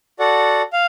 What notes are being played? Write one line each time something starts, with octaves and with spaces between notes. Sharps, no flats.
F#4 A4 D5 F#5
F5